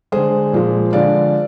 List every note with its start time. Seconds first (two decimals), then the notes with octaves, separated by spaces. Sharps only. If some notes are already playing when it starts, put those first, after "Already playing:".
0.12 D3 G#3 G#4 C5
0.53 A#2 F3 G#3
0.93 D3 F3 G#3 D5 F5